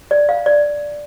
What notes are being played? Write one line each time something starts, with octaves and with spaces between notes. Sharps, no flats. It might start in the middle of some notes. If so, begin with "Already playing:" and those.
D5
F5
D5